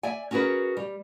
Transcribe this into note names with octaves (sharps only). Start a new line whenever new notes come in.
D5 E5 G#5
C#4 F#4 G#4 A#4 B4
G3